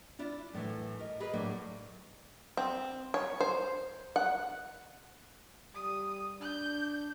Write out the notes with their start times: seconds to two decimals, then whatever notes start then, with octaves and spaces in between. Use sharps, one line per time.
0.19 D4 E4 F4
0.53 F#2 A2 D#3 E3
0.99 A#4 D#5
1.20 G#4 A#4 B4 D#5
1.33 A2 F#3 A#3 D4
2.57 C4
3.14 C#5
3.41 C5
4.16 F#5
5.74 G3 D#6
6.41 D4 G6